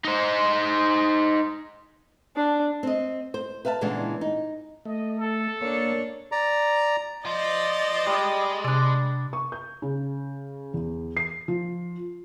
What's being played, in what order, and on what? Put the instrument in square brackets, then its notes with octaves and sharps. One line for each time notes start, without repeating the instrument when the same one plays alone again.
[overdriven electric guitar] D#4 C5
[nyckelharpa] D4
[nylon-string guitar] C4 D#5
C5
B4 E5 F5 G#5 A5
A#2 C#3 E3 G#3 B3 D4
D#4
[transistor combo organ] A3 [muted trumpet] D#5
[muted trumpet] A4
[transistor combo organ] A#3 [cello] D4 C#5
[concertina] D5 A#5
[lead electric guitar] F4 C5 [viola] D5 D#5
[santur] G3 D#6 [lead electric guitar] G#3
[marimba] C3 [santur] D4 D5
[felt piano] C#6
G6
C#3
E2
C7
F3